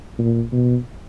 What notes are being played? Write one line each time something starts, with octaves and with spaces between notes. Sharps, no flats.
A#2
B2